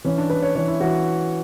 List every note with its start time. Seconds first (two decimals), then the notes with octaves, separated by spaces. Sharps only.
0.05 E3 C#4
0.18 D4
0.30 E3 B4
0.43 C#5
0.55 E3 C#5
0.68 E4
0.80 E3 F#4